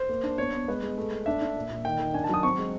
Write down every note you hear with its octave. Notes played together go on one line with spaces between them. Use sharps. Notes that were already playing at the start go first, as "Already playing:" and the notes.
Already playing: C5
A#3
D4
B3 C#5
B3
G#3 B4
G#3
A3
A3
D4 E5
D4
A#2
A#2
D#3 G5
D#3
D4 G#5
A5
F#3 D#6
C4 C#6
G#3